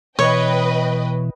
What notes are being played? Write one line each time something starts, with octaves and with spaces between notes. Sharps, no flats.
B2 E3 B4 C#5 D#5 G5